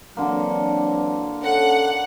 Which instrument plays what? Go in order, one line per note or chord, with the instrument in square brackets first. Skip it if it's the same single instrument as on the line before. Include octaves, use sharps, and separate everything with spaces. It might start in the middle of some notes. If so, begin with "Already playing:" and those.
[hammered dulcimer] D3 A#3 [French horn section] E3 F#3 C4
[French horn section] C#4 A4 [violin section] F#5